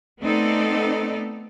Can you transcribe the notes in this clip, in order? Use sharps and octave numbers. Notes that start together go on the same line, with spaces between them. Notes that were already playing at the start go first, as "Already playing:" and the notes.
A3 B3 C4 D#4 A4 D5